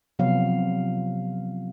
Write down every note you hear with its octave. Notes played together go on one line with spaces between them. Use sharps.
C3 F3 F#3 B3 F5